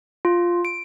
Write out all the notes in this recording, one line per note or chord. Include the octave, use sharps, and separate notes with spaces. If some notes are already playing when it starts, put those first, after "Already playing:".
F4
D7